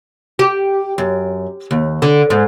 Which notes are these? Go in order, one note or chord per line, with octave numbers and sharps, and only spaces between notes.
G4
F#2
D#2
D3
G#2